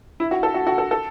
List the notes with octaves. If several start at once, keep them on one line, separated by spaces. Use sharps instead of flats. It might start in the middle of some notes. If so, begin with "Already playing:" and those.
E4
F#4
A4
F#4
F#4
A4
A4